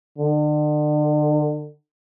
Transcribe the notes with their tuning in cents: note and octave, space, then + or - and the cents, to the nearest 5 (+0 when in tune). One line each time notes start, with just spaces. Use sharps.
D3 +40